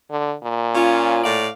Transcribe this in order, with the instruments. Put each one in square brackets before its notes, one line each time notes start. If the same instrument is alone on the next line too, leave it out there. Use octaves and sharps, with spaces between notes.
[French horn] D3
A#2
[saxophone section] C#4 F4
A2 D5 F5